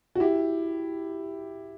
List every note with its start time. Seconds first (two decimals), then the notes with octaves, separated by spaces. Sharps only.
0.15 F#4
0.20 E4 G4